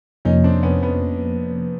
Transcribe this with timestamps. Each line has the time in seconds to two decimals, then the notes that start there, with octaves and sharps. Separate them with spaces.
0.25 F2 C3 F3 A#3 C#4 D#4
0.44 C4 D4
0.63 B3 C#4
0.82 B3 C#4